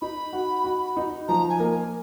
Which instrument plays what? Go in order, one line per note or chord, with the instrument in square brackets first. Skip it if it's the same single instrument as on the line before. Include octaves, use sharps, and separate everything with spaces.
[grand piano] D#4 [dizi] B5
[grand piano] F#4
F#4
D#4
[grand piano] F3 [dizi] A#5
[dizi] G#5
[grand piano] A#3